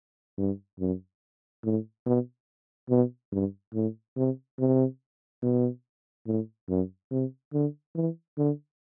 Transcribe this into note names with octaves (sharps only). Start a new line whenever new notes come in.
G2
F#2
A2
B2
B2
G2
A2
C3
C3
B2
A2
F#2
C3
D3
E3
D3